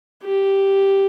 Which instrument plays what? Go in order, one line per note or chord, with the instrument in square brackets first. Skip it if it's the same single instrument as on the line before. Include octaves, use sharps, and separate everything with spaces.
[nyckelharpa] G4